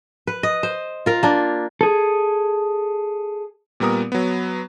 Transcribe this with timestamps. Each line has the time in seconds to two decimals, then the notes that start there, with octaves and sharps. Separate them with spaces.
0.27 B4
0.43 D#5
0.63 C5
1.06 F4 A#4
1.23 A#3 D4
1.81 G#4 A4
3.80 A#2 G3 B3 A#4 D#6
4.12 F#3 B3